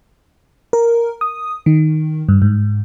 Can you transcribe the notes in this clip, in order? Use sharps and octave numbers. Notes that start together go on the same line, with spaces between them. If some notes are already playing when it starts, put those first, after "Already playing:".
A#4
D#6
D#3
G2
G#2